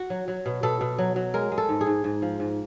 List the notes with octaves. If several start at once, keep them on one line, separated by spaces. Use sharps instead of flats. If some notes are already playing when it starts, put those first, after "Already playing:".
Already playing: F#4
F#3
F#3
B2
B2 A4
B2
F#3
F#3
G#3 A#4
G#3
A4
G#2
G#4
G#2
G#2
F3
G#2